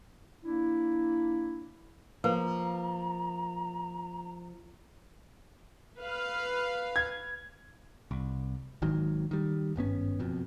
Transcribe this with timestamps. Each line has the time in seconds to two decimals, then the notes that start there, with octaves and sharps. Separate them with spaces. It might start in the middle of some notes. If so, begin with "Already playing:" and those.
0.44 A#3 D4 E4
2.24 F3 A#3 B4 A#5
6.00 B4 F5
6.96 G#6
8.11 C2
8.82 G#1 G#2 D#3 F#3
9.31 D#3 G3
9.76 G#1 G2 B3 C#4
10.19 F#1 F2 B2